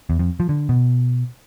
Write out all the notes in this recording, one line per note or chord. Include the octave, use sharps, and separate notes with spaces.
E2
F2
F3
D3
B2